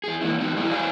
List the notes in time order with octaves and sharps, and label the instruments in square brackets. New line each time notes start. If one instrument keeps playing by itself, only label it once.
[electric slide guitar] E2 G#4
E3 A#3 D4 E4
E3 B3 C4 D#4 F4 F#4
G3 E4 F#4 G#4 D5 D#5
E2 E3 F#3 C5 F5 G#5